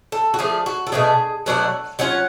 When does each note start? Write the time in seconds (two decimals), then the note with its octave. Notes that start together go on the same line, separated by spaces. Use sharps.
0.12 A4
0.34 F#4
0.39 F3 A3 D4 G#4
0.66 F#4
0.87 A4
0.92 B2 F#3 A3 D4 G#4
1.46 B2 F#3 A3 D4 F#5
1.99 F#3 C#4 F4 F#5